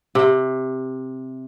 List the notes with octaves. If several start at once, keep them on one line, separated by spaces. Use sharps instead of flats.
C3